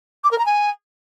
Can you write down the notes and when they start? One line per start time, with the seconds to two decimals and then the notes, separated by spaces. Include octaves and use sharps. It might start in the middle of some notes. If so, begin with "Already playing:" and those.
0.24 D6
0.31 A#4
0.38 A#5
0.46 G#5